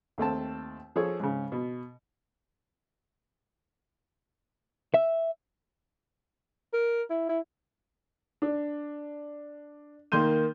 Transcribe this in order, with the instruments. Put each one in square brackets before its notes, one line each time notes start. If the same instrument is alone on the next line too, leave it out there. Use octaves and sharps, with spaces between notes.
[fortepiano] D#2 A3 C4 A5
F3 G#4 A4 C#5
G#2 C#3
B2
[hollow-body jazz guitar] E5
[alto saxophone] A#4
E4
E4
[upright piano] D4
D#3 A#3 C6 G6 D#7